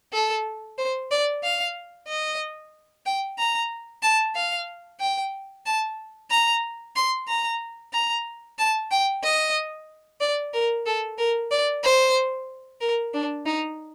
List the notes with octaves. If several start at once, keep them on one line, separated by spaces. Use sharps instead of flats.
A4
C5
D5
F5
D#5
G5
A#5
A5
F5
G5
A5
A#5
C6
A#5
A#5
A5
G5
D#5
D5
A#4
A4
A#4
D5
C5
A#4
D4
D#4